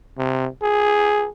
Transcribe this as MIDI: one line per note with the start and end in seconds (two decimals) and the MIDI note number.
0.18 0.47 48
0.62 1.28 68